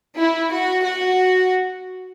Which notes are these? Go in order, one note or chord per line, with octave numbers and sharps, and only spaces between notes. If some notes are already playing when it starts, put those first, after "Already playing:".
E4
F#4
F#4